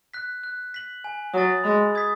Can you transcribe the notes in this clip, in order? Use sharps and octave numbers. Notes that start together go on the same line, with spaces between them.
F#6 B6
F#6
B6 F#7
G#5
F#3 D#6 A6
G#3 B5
D#6 G#6 B6